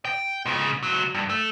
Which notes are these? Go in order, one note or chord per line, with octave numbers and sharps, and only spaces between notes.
G5
G#2 C#3
C#2 F#3
G2
A3